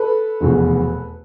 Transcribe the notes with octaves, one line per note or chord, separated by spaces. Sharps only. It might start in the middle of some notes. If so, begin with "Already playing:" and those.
Already playing: A4 B4
F1 E2 B2